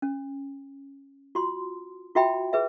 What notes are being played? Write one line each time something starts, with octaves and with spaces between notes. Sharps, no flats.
C#4
F4 F#4 C6
F4 F#4 E5 G5 B5
G#4 B4 E5